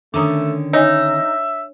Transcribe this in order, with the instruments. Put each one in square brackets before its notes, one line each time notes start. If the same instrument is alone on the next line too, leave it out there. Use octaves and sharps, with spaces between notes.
[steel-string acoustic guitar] D3 D#3 C#4 [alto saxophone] A3 [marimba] D4 A#5 D#6
[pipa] D#4 [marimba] C#5 G#5 [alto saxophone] E5